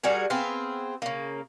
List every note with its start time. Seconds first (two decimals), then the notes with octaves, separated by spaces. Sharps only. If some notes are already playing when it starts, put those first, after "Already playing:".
0.04 G3 F#4 G#4 A#4
0.30 B3 C4 G#4 F5
1.02 C#3 A#3